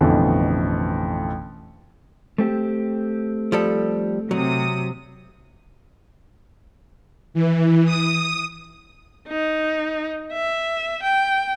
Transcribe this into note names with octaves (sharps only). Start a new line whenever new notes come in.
A1 F2 B2 D3 E3
A3 C4 G4
F3 G3 A4
C3 F#3 D#6
E3
D#6
D#4
E5
G5